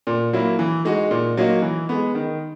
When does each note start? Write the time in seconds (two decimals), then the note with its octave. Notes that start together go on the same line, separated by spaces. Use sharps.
0.07 A#2
0.33 F#3 A#3 E4
0.59 E3
0.85 G#3 D#4 F#4
1.11 A#2
1.37 F#3 A#3 D#4 F#4
1.62 E3
1.89 G#3 B3
2.15 D#3